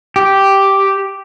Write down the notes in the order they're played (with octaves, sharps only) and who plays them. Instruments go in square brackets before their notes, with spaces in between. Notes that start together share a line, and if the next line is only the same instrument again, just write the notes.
[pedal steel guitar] G4